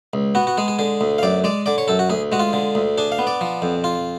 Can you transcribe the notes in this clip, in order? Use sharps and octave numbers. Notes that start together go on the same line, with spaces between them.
C#2
B3 F#4
F#4
G#3 G#4
G#4
D3 G#4
D2
F5
F#2 D5
G#3 D5
D3 D5
C#5
F#2 A4
F#4
D2 G#4
G#3 F#4
F4
D3
D2
D4 G#4
F5
B3
D5
F3
F2
F4